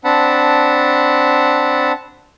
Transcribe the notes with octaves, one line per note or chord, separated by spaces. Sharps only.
C4 D4 F#5 A5 B5